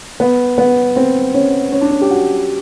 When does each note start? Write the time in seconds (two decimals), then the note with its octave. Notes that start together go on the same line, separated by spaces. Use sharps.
0.20 B3
0.58 B3
0.96 C4
1.34 C#4
1.72 C#4
1.81 D4
1.91 C#4
2.02 G4
2.11 F#4